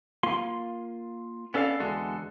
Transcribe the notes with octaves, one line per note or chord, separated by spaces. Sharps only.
A#3 F4 C6
B3 C#4 A4 D5 F5
E2 D3 G#3 F#4 A4